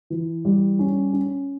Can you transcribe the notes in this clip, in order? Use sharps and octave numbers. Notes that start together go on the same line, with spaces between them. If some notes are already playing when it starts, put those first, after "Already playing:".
E3
G3
C#4
C#4